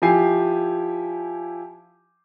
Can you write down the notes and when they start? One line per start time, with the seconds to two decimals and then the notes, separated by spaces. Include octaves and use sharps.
0.02 F3 E4 G4 G#5 C7